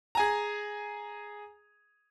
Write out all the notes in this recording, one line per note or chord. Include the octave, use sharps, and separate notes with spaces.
G#4 G#5 A#5